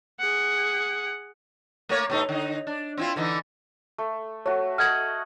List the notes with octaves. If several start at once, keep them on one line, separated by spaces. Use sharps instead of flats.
G#4 F#5
A3 A#3 C#5
B2 A3 D#4
D3 D#4
D4
C4 E4 F4
D3 E3 D#4
A3
A3 F#4 C#5
A4 D#5 F#5 F6 G#6 F#7